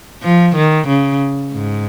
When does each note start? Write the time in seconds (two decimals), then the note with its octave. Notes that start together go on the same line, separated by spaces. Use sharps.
0.23 F3
0.55 D#3
0.87 C#3
1.52 G#2